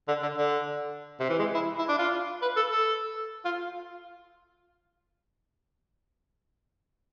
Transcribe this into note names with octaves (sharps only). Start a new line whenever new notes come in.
D3
D3
D3
C3
E3
G#3
E4
E4
D4
F4
B4
A4
A4
F4